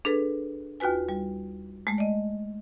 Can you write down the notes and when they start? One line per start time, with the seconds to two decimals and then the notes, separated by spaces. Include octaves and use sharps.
0.05 D4 G#4 A4 B4
0.80 D#2 F4 F#4 B4 G#5
1.09 G3
1.87 G#3 A3
1.98 D5 D#5